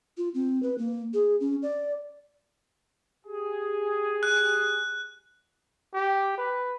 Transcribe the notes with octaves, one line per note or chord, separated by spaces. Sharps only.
F4
C4
B4
A#3
G#4
C#4
D5
G4 G#4
F#6
G4
B4